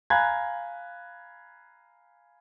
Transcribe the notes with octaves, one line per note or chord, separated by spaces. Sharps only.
F5 G#5 A#5 B5 F#6 G#6